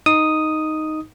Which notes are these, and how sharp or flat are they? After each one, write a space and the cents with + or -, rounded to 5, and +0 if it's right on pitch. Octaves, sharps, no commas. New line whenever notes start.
D#4 +0 D#6 +0